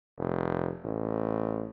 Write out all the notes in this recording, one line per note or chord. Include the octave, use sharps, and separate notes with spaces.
F1
A1